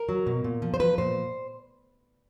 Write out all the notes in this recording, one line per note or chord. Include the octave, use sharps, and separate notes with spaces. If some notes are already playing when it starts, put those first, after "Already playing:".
Already playing: A#4
F#3
B2
A#2
F3
C5
F3 B4
A#2 C5